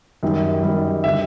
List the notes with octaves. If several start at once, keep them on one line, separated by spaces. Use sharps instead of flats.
F#2 D#3 G3
F#2 D#3 G3
D3 G3 E5